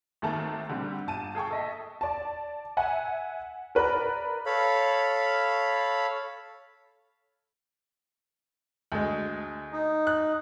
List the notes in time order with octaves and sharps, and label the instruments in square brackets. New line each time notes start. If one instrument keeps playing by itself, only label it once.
[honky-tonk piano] G#1 D#3 A3 A5 A#5
D3 G3 C4
G1 A5 D#7
G#4 A4 G5 C#6
A4 D#5 E5
D5 A5
E5 F#5 G#5
A#4 B4 D5 A#5
[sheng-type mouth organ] A4 C#5 F5 B5
[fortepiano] D2 G#3
[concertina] D#4
[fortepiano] F#6